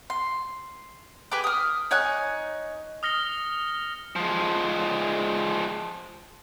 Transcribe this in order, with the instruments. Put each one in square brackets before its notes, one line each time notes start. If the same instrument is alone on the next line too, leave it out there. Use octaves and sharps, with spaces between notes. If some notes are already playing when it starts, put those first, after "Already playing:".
[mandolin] C6
G4 B4 G#5 D6
D#6 F6
D#4 C#5 G#5 F#6
[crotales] D#6 F6 A#6 C#7 G7
[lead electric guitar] F3 G#3